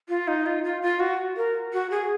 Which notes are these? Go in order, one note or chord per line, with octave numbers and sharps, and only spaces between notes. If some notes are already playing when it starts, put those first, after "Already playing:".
F4
D#4
F4
F4
F4
F#4
A#4
F#4
G#4